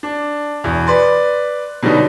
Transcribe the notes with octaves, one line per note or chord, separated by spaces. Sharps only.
D4
E2 B2
B4 D5 C6
B2 D3 F#3 G3 D#4